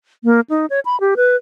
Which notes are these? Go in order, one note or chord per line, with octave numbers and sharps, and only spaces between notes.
A#3
D#4
C#5
B5
G4
B4